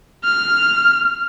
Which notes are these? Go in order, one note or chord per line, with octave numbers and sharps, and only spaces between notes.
F6